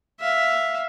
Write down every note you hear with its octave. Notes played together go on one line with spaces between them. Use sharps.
E5 F5